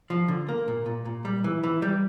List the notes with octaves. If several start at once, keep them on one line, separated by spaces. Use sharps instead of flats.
F3
D3
A#3
A#2
A#2
A#2
G3
E3
E3
G3